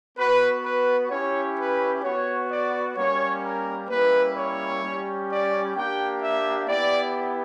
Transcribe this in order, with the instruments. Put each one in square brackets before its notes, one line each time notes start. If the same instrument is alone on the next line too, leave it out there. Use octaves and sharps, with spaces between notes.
[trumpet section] B3 F#4 B4
B4
C#4 E4 G4 C#5
B4
B3 F#4 C#5
D5
G3 A#3 C#4 C#5
A#4
G3 A#3 C#4 E4 B4
C#5
G3 C#4 G4
D5
A#3 D4 G4 G5
E5
B3 E4 G4 D5